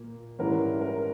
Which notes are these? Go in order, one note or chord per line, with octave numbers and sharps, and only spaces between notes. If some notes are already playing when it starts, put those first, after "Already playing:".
Already playing: A#2 A#3
G#2 E3 G3 C#4 E4 A#4
A#4